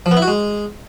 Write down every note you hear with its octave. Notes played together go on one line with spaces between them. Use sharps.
F3
B3
E4
F#4
G#3